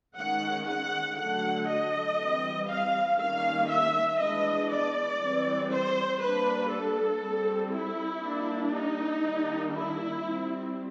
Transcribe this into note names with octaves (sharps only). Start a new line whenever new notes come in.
D#3 G#3 C#4 F#5
F#5
D3 F#3 A3 F#5
D#5
E3 G3 C4
F5
D#3 G3 A#3 C#4 F5
E5
E3 G#3 B3 D4 D#5
D5
E3 G3 C4
C5
G3 A#3 D4 B4
A4
G3 C4
E4
G3 A#3 D4
D#4
D#3 G3 A#3 D4
E4
G3 C4